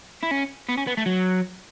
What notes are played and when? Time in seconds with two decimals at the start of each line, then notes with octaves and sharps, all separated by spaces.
0.23 E4
0.31 C#4
0.69 B3
0.77 C#4
0.87 B3
0.97 A3
1.06 F#3